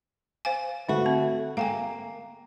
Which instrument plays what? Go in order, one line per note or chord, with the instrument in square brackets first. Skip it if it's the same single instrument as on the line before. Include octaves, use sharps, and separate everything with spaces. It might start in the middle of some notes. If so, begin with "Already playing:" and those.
[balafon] C5 F5 G#5
[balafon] D3 [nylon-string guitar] A3 F#4
[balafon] C4
[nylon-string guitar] A#3 [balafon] F5 G5 G#5